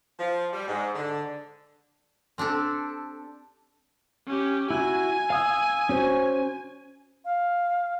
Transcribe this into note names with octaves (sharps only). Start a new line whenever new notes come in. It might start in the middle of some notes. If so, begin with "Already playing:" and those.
F3
G3
G#2
D3
C4 D4 G4 A4
C#4 G4
E4 F#4 G#5
F5 D#6 E6
C#4 F#4 C5
F5